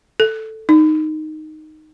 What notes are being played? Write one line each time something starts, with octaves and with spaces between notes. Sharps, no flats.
A4
D#4